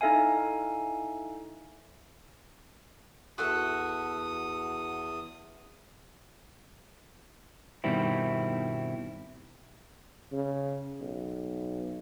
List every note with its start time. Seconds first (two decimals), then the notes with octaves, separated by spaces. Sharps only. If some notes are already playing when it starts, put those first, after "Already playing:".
0.01 D#4 E4 A4 E5 F5 G#5
3.38 E2 F#4 A4 E5 D#6
7.84 G2 B2 D#3 G3 C4 E4
10.32 C#3
11.00 B1